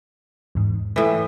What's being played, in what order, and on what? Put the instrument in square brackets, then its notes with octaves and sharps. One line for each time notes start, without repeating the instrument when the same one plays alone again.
[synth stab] E2 G#2
[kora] A2 E3